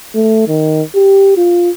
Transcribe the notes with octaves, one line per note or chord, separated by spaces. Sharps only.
A3
D#3
G4
F4